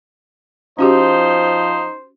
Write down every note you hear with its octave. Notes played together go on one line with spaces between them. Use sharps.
F3 C#4 D#4 F#4 G4 C5